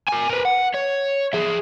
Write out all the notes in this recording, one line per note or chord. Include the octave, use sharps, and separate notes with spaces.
A#4 G#5
A#4 B4
F#5
C#5
G#4 E5